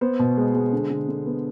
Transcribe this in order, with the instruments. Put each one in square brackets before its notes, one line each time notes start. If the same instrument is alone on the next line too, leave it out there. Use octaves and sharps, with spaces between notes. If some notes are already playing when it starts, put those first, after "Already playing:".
[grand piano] B3 C5
B2
G#3
G#3
D3
D3
D3
B3